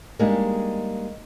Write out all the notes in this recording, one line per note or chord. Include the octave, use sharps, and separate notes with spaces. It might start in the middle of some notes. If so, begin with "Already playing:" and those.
G3 G#3 A#3 D4 D#4 G#4